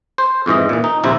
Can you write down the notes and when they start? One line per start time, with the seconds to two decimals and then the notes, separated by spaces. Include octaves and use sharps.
0.18 C5
0.46 F2 G#2 E3 D#5
0.69 A#2 E3
0.84 D#4
1.04 A#1 D#2 C3 E4 C5 A#5